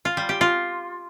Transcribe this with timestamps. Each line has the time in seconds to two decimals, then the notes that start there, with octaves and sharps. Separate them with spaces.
0.05 F4
0.17 G3
0.29 G4
0.41 F4